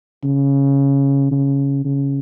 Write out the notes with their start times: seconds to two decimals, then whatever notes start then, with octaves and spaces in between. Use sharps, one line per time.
0.24 C#3
1.31 C#3
1.85 C#3